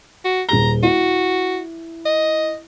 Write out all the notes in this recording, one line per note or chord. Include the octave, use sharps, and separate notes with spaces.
F#4
D#1 G#4 A#5 G7
E4 F#4
D#5